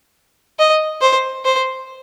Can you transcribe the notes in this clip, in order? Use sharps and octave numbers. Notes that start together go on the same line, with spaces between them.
D#5
C5
C5